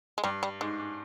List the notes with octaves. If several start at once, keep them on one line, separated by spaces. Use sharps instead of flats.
G#3
G2 G3
G3
G#2 G#3
G#2